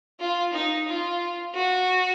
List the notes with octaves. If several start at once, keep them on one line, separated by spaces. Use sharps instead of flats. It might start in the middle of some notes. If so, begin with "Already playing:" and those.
F4
D#4
F4
F#4